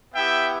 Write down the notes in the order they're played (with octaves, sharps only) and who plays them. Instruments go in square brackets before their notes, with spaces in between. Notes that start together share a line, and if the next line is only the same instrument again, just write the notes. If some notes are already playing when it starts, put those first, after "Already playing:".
[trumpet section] B3 E4 G4 E5 G5